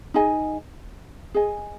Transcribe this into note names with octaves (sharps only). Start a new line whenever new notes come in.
D#4 G#4 D#5 G#5
G#4 D#5 G#5